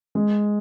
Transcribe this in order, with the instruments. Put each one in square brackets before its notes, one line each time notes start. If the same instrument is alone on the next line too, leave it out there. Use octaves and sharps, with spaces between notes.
[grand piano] G#3